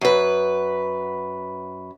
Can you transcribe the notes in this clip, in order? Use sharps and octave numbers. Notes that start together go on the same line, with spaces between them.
F#2 B4